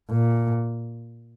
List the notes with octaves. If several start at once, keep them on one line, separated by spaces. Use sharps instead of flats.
A#2